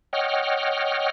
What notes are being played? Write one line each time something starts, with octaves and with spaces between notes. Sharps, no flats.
C#5 D#5 F#5 G5 F6